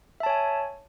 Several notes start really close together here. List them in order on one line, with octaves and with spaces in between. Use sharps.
E5 A5 C#5 G#5